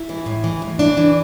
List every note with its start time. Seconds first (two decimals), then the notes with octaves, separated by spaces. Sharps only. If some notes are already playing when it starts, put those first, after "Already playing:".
Already playing: E4
0.09 E3
0.26 A2
0.44 E3
0.62 A2
0.79 E3 D4
0.97 E3